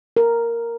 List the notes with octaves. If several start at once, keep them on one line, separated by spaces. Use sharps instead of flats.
A#4